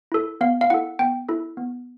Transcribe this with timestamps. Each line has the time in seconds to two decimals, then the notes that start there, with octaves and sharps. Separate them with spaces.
0.12 E4 A4
0.41 B3 F5
0.61 F5
0.70 E4 A4 F#5
0.99 B3 G5
1.29 E4 A4
1.57 B3